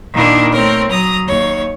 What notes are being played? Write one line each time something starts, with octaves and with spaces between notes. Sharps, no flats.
A#2 D#3 A#3 D4 E4 A#4
A3 C4 A#4 C#5
F#3 A#5 D#6
D#2 C#5